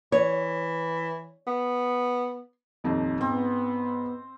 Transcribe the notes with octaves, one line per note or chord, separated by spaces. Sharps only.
E3 C#5
B3
D#1 F2 D#4
G#2 B3 C4